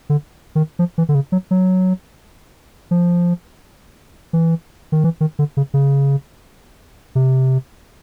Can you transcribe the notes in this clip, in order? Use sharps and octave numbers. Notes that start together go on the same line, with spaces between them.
D3
D#3
F3
E3
D3
C#3
F#3
F#3
F3
E3
D#3
E3
D#3
D3
C#3
C#3
C3